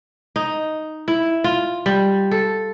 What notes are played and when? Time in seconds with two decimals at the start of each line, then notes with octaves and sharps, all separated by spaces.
0.36 D#4
1.08 E4
1.44 F4
1.86 G3
2.31 A4